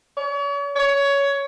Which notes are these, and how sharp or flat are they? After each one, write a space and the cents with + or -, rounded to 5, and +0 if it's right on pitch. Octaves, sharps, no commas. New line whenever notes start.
C#5 +40
C#5 +15